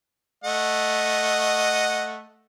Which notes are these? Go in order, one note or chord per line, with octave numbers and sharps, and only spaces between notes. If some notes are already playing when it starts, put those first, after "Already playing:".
A3 D#5 F#5